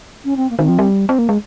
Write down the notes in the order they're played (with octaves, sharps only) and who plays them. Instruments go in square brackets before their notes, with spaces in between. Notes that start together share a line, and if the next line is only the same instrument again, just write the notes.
[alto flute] C#4
C4
A#3
[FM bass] D#3 [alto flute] C#4
[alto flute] C4
[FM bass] F3
G3
C4
A#3
G#3